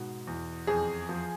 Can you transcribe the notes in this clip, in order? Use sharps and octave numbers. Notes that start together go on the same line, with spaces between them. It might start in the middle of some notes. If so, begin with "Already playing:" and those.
Already playing: G#2 B2
E2
F2 G#4
F3